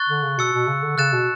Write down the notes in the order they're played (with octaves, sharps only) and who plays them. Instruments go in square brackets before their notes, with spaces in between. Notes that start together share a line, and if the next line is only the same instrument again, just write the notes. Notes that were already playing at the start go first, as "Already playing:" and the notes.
Already playing: [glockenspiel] C#6 F#6 A6
[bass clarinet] D3
C#3
[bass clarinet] B2 [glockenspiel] E6 A6 C#7
[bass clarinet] B2
C#3
D3
[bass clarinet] C#3 [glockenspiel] F#6 A6 E7
[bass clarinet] B2